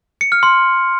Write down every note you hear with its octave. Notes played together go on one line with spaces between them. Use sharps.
C#7
F6
C6